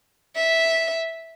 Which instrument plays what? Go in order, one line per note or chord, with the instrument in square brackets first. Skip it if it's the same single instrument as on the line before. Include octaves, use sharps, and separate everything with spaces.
[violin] E5